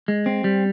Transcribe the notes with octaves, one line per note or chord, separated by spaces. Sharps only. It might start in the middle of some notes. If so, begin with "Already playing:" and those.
G#3
C4
G3